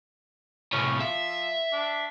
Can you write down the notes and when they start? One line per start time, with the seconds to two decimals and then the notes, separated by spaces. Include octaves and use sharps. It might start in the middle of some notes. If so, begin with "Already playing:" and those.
0.73 A2 C3 C#4
1.01 F3 E5
1.73 D4